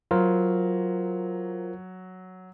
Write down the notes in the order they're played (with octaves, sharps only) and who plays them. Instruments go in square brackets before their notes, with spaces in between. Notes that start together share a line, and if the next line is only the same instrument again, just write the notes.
[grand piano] F#3 [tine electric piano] F4 A#4 C5